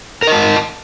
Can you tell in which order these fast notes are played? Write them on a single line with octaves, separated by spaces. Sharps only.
A#4 D#5 A5